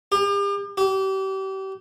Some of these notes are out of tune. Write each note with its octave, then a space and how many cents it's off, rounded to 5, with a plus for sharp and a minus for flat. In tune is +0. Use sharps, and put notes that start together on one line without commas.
G4 +40
G4 -35